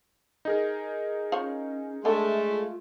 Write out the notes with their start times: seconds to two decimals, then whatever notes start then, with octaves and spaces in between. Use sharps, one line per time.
0.45 D#4 G#4 A#4
1.32 C#4 F4 C5 C#5
2.05 G#3 A3 D4 A4 E5
2.50 F4